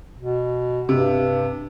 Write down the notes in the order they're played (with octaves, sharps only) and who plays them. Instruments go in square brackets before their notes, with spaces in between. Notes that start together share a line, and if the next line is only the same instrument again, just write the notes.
[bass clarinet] B2
[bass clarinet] G2 [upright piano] C3